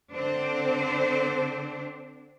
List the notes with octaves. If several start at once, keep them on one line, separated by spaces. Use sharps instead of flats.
D3 C4 D4 C5